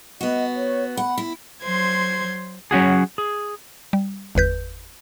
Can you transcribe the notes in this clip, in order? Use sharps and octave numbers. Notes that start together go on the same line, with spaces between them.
B3 F#4 D#5
C#5
F#5 B5
E4
F#3 C5 C6 G#6
F#3 C#4 F#4 G#4
G#4
G3
G1 E2 B4 G6